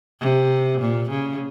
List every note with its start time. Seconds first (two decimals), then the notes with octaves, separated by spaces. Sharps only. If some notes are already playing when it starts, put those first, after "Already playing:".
0.21 C3
0.80 A#2
1.10 C#3